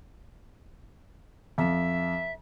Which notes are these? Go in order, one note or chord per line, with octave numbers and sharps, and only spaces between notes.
F2 E5